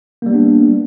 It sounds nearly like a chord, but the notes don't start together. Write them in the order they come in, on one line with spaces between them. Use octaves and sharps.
A#3 G3 B3 D4